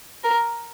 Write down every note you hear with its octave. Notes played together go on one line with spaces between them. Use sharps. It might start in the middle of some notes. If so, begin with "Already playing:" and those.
A#4